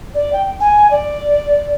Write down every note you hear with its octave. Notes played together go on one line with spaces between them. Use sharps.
D5
G5
G#5
D5